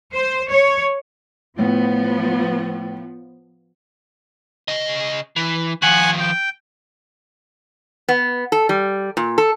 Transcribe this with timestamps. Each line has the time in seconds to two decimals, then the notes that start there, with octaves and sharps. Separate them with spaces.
0.15 C5
0.50 C#5
1.59 A2 F3 B3
4.68 C#3 D#5
5.36 E3
5.82 D#3 F3 F#5 G#5 F#6
6.20 G5
8.09 B3
8.52 A4
8.69 G3
9.17 A#2
9.38 A4